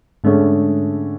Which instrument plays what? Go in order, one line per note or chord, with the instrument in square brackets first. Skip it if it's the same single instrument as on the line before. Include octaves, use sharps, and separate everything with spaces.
[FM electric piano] G#2 G#3 [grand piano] D3 A3 C#4 G#4